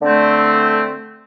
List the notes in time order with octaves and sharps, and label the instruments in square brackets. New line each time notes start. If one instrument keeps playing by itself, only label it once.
[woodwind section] D3 A3 C4